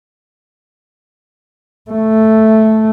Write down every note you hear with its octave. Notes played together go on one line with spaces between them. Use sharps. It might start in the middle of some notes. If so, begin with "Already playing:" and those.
A3